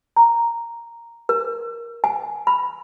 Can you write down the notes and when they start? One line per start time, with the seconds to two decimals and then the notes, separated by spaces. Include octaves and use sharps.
0.16 A#5
1.29 A#4
2.04 G#5
2.47 B5